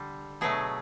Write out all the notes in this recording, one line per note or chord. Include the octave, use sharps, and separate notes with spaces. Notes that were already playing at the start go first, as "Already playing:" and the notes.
Already playing: D3 G3
B2 F#3 A3 G#4